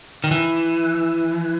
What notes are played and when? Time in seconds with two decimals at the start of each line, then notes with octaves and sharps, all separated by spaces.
0.24 D#3
0.31 E3